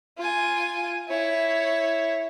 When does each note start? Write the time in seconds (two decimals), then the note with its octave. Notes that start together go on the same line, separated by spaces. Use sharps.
0.18 F4 G#5
1.08 E4 C#5